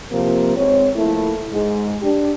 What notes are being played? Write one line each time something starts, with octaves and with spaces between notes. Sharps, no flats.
C3 F3 A#3
G#2 C4 C#5
F3 A3 A#3 E4
G#2 G#3
D4 G4